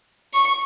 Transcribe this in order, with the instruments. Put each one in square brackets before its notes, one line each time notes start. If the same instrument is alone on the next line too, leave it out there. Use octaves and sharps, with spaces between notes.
[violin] C#6